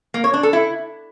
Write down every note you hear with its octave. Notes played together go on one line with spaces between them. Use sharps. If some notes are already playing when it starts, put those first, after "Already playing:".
A#3
C#5
D4
A4
E4